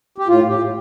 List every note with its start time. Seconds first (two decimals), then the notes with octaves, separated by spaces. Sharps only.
0.18 G4
0.28 A2 F4
0.44 A2 G4
0.58 A2